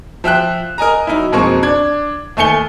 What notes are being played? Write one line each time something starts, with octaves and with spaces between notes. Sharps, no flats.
F3 E5 G5 F#6
A#4 D#5 G#5 A#5
F#3 D#4 E4
F2 B2 G#3 A#3 C4 C#6
D4 G#6
D#2 A3 G#5 C#7 G7